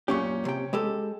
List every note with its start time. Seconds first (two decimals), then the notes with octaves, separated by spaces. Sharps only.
0.08 F#2 A#2 C#4 G4 C#6
0.45 C3 G5
0.73 G#3 G4 A4